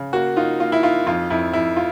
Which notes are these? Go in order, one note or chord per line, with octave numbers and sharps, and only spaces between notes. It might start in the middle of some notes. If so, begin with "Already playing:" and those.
Already playing: C#3
A#3 F#4
D#4 F4
A#3 F4
E4
D#4 F4
F2 F4
F2 E4
F2 E4
F4